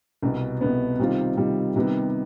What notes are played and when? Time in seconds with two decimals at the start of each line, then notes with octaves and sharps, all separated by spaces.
0.22 C2 B2 B3
0.61 C2 B2 B3
0.99 C3 D#3 G3 C4 F4
1.37 C3 D#3 G3 C4 F4
1.76 C3 D#3 G3 B3